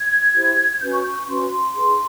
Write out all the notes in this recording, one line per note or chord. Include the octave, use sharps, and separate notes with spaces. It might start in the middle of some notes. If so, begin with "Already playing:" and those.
Already playing: G#6
E4 G4 C5
C#4 F#4 B4 G6
C#6
G6
C#6
C#4 F#4 B4 C6
D#4 G#4 B4